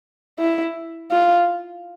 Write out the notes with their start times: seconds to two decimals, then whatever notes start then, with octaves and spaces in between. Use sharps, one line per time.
0.39 E4
1.11 F4